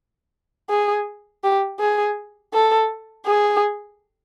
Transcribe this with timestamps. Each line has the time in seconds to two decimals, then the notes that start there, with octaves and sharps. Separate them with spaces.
0.70 G#4
1.44 G4
1.80 G#4
2.53 A4
3.26 G#4